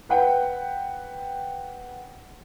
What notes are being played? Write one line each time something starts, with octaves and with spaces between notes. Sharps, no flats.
B4 F#5 G5